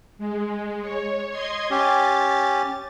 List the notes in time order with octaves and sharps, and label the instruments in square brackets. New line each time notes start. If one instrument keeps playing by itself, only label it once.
[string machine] G#3
C#5
D#5 C6 G#6
[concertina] C#4 G4 [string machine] A6